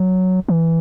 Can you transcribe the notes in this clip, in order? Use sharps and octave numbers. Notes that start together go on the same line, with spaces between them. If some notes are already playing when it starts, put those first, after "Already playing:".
Already playing: F#3
E3